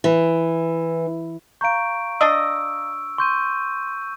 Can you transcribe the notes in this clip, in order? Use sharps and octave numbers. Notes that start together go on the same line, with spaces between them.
E3
F5 A#5 C#6 G6 D7
D4 D#5 E6
C6 C#6 G6 D#7